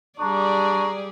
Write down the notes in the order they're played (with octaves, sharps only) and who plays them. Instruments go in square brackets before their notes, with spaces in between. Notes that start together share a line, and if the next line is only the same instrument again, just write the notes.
[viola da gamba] G3 G#4 D5 [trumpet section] D4 A#5 C#6